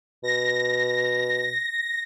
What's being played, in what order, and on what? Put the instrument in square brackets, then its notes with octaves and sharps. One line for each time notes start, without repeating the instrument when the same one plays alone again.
[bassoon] B2 [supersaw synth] A#6